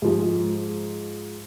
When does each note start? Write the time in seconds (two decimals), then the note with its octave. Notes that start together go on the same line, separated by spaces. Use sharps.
0.02 G#2 F3 G#3